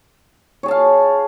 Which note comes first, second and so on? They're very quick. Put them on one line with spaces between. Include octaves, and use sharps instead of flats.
C#5 G#4 A5 F5